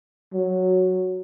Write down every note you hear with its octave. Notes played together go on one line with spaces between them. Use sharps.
F#3